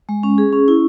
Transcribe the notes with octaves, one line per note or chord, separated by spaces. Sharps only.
G#3
C#4
G#4
C#4
E4